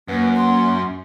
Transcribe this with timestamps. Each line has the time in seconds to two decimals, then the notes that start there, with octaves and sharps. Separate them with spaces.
0.08 F#2 A#3 B4
0.36 C6